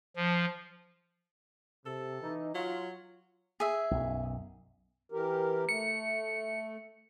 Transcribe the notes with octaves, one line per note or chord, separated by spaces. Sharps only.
F3
C3 A4
E3 D#4
F#3 F4
G#4 E5
B1 F#2
E3 G4 A#4
A3 C#7